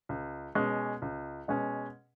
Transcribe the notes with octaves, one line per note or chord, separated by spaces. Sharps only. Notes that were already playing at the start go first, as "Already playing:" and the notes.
C#2
B2 G#3 C#4
C#2
B2 G#3 C#4